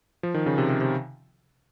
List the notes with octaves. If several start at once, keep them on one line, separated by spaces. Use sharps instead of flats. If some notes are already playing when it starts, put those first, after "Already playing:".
F3
D#3
C#3
C3
C3
C3